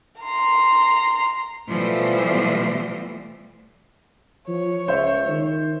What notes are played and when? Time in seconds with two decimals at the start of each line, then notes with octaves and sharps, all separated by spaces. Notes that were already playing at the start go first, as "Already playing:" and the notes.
0.22 A#5 C6
1.68 B2 E3 F3 G3 A3
4.48 F3 C#5
4.88 C#2 C5 E5
5.29 D#3